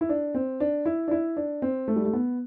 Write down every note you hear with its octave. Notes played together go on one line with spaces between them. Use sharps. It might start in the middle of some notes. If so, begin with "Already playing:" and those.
E4
D4
C4
D4
E4
D4
E4
D4
C4
A3
G3
A3
B3